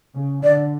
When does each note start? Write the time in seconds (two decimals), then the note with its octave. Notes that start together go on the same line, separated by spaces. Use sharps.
0.14 C#3
0.43 D3 D5